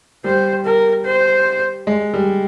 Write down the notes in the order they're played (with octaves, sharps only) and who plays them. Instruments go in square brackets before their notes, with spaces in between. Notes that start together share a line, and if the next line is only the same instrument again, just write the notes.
[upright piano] G3 [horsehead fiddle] C5
[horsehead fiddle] A#4
C5
[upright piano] G#3
G3